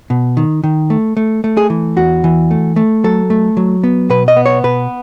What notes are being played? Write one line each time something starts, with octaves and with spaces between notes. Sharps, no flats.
B2
D#3
D#3
A3
A3
A3
G#4
E3
E2 F#4
E3
A3
A3
F#3 A4
A3
F#3
B3
B2 B4
D#5
B3
C#5
B2 B4